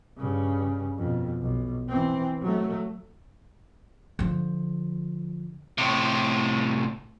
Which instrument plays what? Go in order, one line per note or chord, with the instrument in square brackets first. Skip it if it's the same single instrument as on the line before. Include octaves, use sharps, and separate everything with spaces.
[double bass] G2 C#3
F2 B2
B1
E3 C4
F#3 A3
[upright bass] D3 F3
[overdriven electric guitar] A2 C3